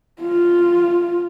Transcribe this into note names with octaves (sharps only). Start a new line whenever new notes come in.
F4